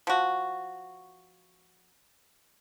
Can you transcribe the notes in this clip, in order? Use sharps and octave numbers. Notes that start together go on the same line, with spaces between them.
F3 F#4